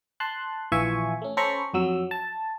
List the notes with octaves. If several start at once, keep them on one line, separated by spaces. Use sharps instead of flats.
A5 C6 F#6
A#1 E3 F4 E5 G#5 C#6
A3 C#4
C#4 A4 C5 A#5 B5 C#6
F2 F#3 E6
A5